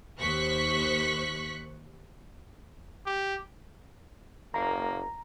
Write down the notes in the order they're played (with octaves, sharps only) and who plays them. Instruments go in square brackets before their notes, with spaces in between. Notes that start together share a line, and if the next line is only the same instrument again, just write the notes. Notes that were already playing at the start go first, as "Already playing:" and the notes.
[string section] D#2 C5 C#6 F#6 B6
[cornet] G4
[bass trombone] F#1 [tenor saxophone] A#3 [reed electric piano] A#5